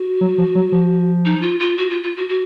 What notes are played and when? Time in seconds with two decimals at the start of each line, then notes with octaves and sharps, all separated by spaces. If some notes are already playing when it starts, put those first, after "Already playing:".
Already playing: F#4
0.21 F#3
0.38 F3
0.55 F#3
0.72 F3
1.25 D#4
1.42 F4
1.60 F4
1.77 F#4
1.90 F4
2.03 F4
2.16 F#4
2.29 F#4